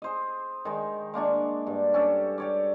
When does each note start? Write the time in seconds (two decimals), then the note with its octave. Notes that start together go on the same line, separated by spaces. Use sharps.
0.02 G#4 C5 D#5
0.65 D#3 G#3
1.14 G#3 A#3 D4 C#6
1.67 G2
1.94 C#4 G4 A4
2.38 G4 C#5 D5